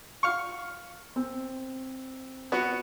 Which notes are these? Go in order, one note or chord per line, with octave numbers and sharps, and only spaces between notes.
F5 C#6
C4
B3 F#4